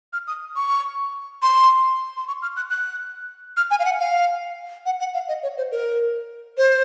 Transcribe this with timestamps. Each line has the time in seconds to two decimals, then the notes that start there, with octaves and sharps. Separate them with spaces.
0.13 F6
0.27 D#6
0.56 C#6
1.42 C6
2.17 C6
2.28 C#6
2.42 F6
2.57 F#6
2.71 F#6
3.57 F6
3.71 G#5
3.79 F5
3.85 F#5
4.00 F5
4.86 F#5
5.00 F#5
5.14 F5
5.28 D#5
5.43 C#5
5.57 C5
5.72 A#4
6.58 C5